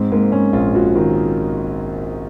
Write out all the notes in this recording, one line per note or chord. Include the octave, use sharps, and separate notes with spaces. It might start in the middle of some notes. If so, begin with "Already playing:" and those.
Already playing: G#2 C4
G#2 A#3
G#2 C#4
A#1 F4
A#1 F#4
D#3